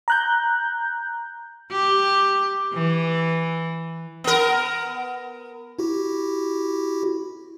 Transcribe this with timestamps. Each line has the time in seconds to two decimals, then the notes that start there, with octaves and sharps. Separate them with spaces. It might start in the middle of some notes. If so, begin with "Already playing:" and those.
0.08 A#5 F#6 G6
1.71 G4
2.74 E3
4.24 B3 A#4
5.79 E4 F#4 G4